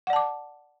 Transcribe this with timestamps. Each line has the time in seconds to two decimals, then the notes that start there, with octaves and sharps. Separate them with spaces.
0.07 F#5
0.10 D5
0.13 A5
0.16 D6